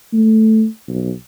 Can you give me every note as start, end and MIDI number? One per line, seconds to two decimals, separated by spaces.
0.13 0.66 57
0.89 1.12 35